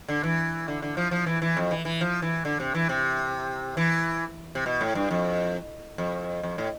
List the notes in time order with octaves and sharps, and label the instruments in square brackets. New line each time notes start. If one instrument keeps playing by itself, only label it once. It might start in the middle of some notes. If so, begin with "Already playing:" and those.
[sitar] D3
E3
D3
D3
F3
F3
E3
E3
F2
E3
E3
F3
E3
D3
C3
E3
C3
E3
C3
B2
A2
G2
F2
F2
F2
A2